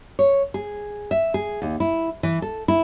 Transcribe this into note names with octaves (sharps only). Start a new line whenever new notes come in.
C#5
G#4
E5
G#4
D#2
E4
E3
A4
E4